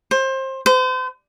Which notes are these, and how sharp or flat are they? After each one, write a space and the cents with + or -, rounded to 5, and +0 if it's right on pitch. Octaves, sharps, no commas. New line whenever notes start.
C5 +25
C5 -40